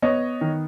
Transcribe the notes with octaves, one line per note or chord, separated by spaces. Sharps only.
B3 C#5 D#5
D#3